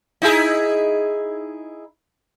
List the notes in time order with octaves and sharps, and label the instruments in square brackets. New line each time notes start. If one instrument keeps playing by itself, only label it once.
[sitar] D#4 E4 G#4